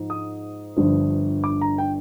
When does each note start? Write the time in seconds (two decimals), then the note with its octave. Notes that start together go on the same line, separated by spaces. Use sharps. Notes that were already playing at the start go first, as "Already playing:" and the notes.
Already playing: G#2 F3
0.10 D#6
0.76 G1 G2 F3
1.44 D6
1.61 A#5
1.78 G5